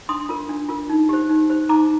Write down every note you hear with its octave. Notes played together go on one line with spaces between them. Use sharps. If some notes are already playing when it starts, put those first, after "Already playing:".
D4 C6 D#6
F4 A#4
D4
F4 A#4
D#4
G4 C5
D#4
G4 C5
D#4 A#5 D6